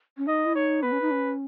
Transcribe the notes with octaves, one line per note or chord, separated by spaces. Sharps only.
C#4
D#4 D#5
E4
D#4 C#5
B3 B4
C#4
D#4
C#4